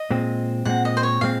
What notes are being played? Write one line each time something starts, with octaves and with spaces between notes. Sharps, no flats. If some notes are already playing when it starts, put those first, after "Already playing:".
Already playing: D#5
A#2 G#3 C4
A#2 G#3 C4 F#5
D#5
C5
C#5
A#2 G#3 C4 F5